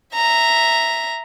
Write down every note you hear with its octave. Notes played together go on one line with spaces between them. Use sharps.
E5 A#5